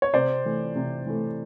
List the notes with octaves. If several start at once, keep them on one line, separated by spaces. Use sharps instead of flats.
C#5
C3 C5 D5
E3 A3
C3
E3 A3